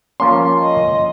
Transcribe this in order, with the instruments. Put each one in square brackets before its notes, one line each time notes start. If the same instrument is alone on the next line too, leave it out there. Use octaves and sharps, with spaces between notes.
[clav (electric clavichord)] F3 A#3 C#4 [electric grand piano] C6
[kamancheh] D#5